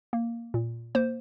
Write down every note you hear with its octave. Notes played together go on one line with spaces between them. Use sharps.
A#3
A#2
A#3 C5